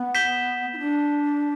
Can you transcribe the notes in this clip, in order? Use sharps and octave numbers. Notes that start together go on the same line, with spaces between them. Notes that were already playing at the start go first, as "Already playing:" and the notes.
Already playing: B3
G6 B6 E7 G7
E4
D4